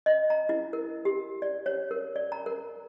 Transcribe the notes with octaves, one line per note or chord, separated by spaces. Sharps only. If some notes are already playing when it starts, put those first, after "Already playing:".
D#5
A#5
E4
A#4
G4
D5
C#5
A#4
D5
A#5
A#4